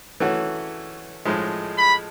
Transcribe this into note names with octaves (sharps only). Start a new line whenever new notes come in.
E3 A3 C#4 F#4
A2 F3 G#3
B5